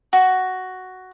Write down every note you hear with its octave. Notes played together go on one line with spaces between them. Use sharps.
F#4